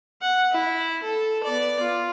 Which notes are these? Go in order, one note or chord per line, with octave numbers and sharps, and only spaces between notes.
F#5
E4
A4
B3 D5
F4